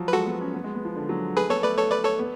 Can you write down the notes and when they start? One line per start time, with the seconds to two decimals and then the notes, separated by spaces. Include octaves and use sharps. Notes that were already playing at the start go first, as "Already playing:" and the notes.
Already playing: F3 F#3
0.08 B4
0.13 G#3 F#4 A4
0.26 B3
0.41 C#4
0.54 B3
0.64 G#3
0.75 B3
0.85 F3
0.96 D3
1.09 F#3
1.37 A3 G#4 B4
1.49 B3 A4 C#5
1.62 A3 B4 D5
1.78 A4 C#5
1.91 B4 D5
2.04 A4 C#5
2.19 B3